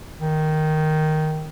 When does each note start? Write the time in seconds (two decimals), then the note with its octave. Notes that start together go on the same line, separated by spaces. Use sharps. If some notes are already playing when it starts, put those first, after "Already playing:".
0.22 D#3